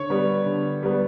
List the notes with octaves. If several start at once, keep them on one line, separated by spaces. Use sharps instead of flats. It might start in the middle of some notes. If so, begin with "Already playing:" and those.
Already playing: D3 C#5 C#6
G3 B3
D3
G3 B3